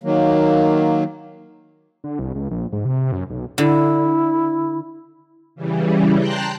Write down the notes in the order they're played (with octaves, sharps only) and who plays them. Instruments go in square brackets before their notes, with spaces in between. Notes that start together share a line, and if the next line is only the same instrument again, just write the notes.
[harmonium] D#3 F#3 A#3
[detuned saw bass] D3
C2
C#2
A#1
G#2
C3
F#2
B1
[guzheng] D3 [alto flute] E4
[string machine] C#3 E3 G3
G5 A5 A#5 C6 F#6 G6